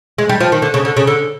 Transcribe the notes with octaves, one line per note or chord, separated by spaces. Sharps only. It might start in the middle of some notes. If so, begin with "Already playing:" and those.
G#3
G3
F3
D#3
D3
C#3
D3
C#3
D3